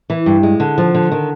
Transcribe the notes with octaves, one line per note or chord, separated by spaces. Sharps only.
E3
G2
G#3
D3
F3
D3
D#3